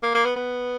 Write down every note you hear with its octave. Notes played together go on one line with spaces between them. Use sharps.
A#3
A#3
B3
B3